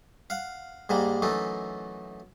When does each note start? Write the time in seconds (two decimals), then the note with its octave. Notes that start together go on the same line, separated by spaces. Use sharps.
0.30 F5 F#5
0.89 G#2 G3 G#3 A#3
1.22 F#2 E3 A3 D#4